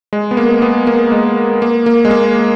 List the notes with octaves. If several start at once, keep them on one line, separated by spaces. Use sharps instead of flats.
G#3
B3
A#3
B3
A#3
G#3
A#3
A#3
G#3
A#3